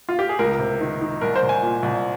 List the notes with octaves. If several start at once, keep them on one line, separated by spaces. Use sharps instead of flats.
F4
G4
G#4
C#2 A#4
C3
D#3
D#3
C2 A#4
C5
C2
G#5
A#2
C2